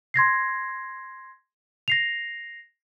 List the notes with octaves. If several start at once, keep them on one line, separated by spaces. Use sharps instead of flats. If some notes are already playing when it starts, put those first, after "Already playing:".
C6 G#6 A#6 C7
A#6 C7 F7